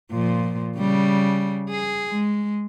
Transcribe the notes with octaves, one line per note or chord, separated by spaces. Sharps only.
A#2 F3
C#3 G3
G#4
G#3